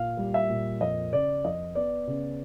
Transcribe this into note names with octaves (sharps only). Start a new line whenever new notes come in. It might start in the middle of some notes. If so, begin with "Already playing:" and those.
Already playing: A#2 F5
G3
E5
A#2
F2 D#5
C#3 D5
F2 D#5
B3 D5
C#3